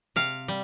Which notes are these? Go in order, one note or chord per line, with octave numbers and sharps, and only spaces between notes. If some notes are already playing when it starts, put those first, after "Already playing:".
C3 F5
G3